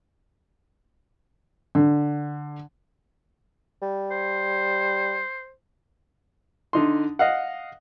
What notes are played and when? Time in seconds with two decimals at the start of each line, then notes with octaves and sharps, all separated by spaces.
1.75 D3
3.82 G3
4.11 C5
6.73 D3 D#4 C6
7.19 D#5 F5 F#5